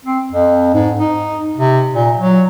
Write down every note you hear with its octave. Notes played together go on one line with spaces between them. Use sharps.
C4
F2
G#2
D#4
C3
A#2
F#3